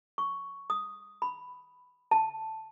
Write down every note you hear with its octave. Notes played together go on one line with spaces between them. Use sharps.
C#6
D#6
B5
A5